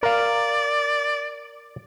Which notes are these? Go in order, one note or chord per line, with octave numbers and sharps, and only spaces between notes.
A#4 D5 F5